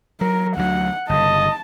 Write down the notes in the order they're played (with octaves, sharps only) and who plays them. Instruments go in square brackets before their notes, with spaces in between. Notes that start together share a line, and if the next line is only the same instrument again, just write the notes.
[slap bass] F#3 [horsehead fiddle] A#4
[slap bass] D2 F#3 [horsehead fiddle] F#5
[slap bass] G1 C#3 [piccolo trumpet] D#5 [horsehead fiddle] A5